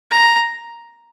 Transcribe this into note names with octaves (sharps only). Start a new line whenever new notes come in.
A#5